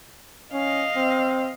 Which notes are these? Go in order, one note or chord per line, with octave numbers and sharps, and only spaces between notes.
C#4 D#5 F5
C4